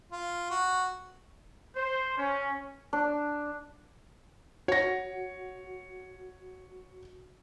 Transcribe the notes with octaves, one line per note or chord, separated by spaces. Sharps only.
F4
F#4
C5
C#4
D4
F#4 C#5 A#6